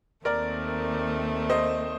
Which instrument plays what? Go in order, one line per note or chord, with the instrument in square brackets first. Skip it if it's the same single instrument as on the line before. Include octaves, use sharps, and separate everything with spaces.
[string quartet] D#2 D#3 A3 C4 [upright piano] A#4 D5
[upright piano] C5 D#5